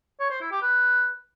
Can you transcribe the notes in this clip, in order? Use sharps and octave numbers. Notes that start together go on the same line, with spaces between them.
C#5
C5
E4
G4
B4